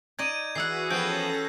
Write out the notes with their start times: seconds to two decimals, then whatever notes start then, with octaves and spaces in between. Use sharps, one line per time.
0.19 D#4 D5 D#5 G#6 D#7
0.55 E3 F#4 G#4 B4 F#5 E6 C7
0.90 F3 B3 C#4 A4 G5 G6 G#6 A#6